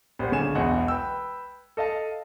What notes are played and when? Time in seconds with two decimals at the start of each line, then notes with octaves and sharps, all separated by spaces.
0.19 A#1 G4 C5 F#5
0.32 C#2 D3 C#5 G#5 E7
0.55 E1 B1 B2 E3 D#5 F#5
0.88 B4 G5 E6
1.77 A4 D#5 F5 A5